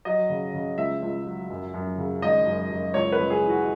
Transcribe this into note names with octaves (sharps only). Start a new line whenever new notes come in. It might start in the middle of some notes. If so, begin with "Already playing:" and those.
F#3 D#5
C#3
C#3
C#2 E5
C#2
F#3
F#2
F#2
C#3
G#1 D#5
F#2
F#2
C#2 C#5
B4
C#2
G#4
E3
F#4